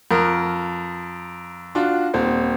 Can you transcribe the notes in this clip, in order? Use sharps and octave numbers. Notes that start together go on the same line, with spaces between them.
F2 A#4
D4 F4 F#4
D#1 C4